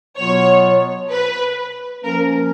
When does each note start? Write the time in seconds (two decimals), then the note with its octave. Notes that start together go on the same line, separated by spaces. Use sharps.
0.18 B2 F#3 B3 F4 C#5
1.10 B4
2.04 F3 A#3 C#4 A#4